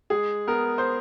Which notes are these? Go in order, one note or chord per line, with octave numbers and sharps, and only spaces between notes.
G#3 G#4
B3 A#4
C5